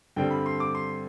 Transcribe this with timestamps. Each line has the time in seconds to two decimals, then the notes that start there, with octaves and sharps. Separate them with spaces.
0.16 G2 D3 G3 C4 G5
0.31 B5
0.46 C6
0.60 D6
0.75 C6